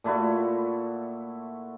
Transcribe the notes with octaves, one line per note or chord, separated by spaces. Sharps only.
A#2 A3 E4 F#4